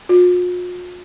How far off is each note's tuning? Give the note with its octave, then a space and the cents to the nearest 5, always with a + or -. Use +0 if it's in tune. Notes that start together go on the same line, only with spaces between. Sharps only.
F4 +45